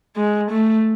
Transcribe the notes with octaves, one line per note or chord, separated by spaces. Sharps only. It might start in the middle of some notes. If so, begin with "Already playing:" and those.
G#3
A3